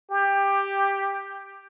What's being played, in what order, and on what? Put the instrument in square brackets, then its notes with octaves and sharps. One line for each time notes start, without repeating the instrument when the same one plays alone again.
[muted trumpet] G4